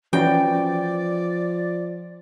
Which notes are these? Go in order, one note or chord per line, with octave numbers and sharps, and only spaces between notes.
E3 F3 C#4 F#4 D5 G5